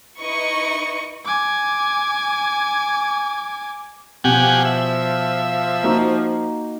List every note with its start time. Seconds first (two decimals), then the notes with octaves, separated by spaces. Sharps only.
0.20 D#4 E4 B4 D#5 C#6
1.25 G#5 D6
4.24 B2 F3 G4 F#5 G#5
4.65 E5
5.84 A#3 D#4 F#4